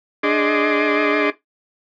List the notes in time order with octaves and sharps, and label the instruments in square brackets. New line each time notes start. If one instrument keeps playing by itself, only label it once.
[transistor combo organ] D4 G#4 D#5 C6 D6